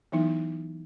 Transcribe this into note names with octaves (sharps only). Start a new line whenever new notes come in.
E3 F#3 B3 D#4 E4